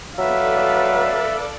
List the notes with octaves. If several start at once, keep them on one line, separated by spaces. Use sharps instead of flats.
F#3 A4 B4 D5 E5 F5